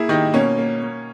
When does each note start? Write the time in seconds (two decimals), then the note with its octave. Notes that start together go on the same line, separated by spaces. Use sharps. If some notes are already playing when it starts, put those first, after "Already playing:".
Already playing: A#3 E4 G#4
0.09 D#3 D#4 G4
0.33 B2 A#3 C#4
0.58 A#3
0.82 A#3